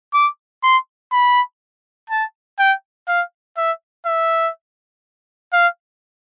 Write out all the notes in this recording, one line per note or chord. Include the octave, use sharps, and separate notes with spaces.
D6
C6
B5
A5
G5
F5
E5
E5
F5